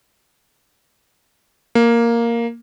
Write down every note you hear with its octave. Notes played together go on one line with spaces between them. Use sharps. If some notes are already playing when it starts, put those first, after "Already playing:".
A#3